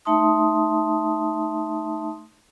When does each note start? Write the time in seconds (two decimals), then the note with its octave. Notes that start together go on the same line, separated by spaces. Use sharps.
0.05 A3 D#4 E5 A5 C6 D#6